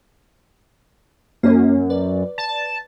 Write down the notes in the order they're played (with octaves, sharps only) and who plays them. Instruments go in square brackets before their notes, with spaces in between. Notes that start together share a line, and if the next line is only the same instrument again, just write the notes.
[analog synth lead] F#2 [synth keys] A#3 C#4
[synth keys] B4 D5
[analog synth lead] A5